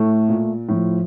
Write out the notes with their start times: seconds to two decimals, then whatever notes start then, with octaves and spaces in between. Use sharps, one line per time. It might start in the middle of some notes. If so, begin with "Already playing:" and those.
Already playing: A2 A3
0.29 A#2
0.69 A2 F3